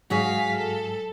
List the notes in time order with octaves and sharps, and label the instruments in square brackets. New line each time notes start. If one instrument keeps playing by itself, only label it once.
[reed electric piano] G#2 F#3 [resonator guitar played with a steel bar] F#4 G#4 C#5 [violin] F5 B6
[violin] A4